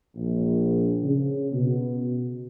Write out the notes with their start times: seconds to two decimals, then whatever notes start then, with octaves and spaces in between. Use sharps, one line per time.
0.16 A#1
1.02 C#3
1.52 B2